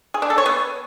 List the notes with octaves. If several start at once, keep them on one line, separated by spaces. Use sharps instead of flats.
G#4
D4
A4
C#5
B3